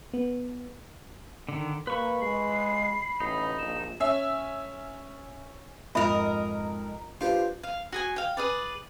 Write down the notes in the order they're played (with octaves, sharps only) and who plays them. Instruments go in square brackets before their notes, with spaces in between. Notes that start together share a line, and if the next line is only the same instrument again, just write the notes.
[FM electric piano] B3
[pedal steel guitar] D3 D#3
[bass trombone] A#3 [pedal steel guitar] B4 C#6 [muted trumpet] B5
[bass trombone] G#3 [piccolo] C7
[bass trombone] A1 [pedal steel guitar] D#4
[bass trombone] A#1 [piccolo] E7
[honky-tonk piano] C#4 E5
[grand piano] F2 G#2 [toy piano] F4 E5 B5 [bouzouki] A#4 D#5
[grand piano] D4 B4 C5 [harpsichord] F4 G4
[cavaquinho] F5
F#4 G#4 G#5
F5 G5
G#4 B4 D5